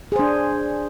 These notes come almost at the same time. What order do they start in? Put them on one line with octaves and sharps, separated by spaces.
G#4 C5 D4